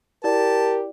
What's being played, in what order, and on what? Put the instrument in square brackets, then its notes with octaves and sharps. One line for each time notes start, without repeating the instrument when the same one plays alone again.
[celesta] E4 D5 [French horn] G4 [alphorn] A#4 [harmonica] A5